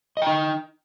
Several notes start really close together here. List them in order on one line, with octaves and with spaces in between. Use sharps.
D#5 G5 D#4